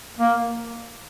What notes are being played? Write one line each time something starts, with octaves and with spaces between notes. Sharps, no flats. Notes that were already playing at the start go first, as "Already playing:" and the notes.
A#3